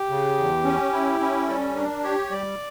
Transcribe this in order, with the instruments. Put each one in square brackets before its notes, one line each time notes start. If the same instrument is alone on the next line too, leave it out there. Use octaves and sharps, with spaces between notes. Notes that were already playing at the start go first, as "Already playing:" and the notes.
Already playing: [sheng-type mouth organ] G4
[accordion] C#3
E2
C#4
E4
C#4
[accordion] G3 [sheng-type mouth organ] A4
[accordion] D4 [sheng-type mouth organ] A#4
[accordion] G4 [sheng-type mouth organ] C#5
[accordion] G3 [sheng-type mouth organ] D5